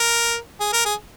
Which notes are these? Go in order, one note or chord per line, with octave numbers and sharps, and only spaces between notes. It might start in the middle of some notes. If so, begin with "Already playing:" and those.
Already playing: A#4
G#4
A#4
G#4